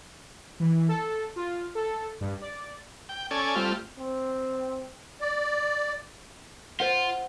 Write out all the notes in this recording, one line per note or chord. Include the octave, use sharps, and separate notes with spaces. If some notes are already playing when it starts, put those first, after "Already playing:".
E3
A4
F4
A4
G2
D5
G5
C#4 A4 D5 G#5
G3 A3 C4 F4
C4
D5
F4 C5 F#5